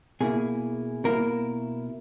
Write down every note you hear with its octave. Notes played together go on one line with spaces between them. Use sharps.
B2 A#3 E4 G#4
B2 A#3 E4 A#4